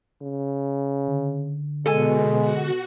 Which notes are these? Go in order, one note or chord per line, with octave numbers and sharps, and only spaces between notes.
C#3
D3
B2 G#3 A4 G#5
F#4